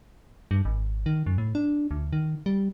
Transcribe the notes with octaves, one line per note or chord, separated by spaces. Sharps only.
G2
G#1
D#3
F#2
A2
D4
D2
D#3
G3